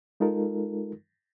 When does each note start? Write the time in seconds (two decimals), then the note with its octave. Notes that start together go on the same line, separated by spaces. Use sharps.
0.20 G#3 D#4 F4 A4 A#4